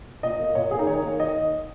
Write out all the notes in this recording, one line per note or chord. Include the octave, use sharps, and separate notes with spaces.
A#2 D#5
A#3
A#2 C#5
A#3 G#4
D#4
D#3 C#5
A#3
D#3 D#5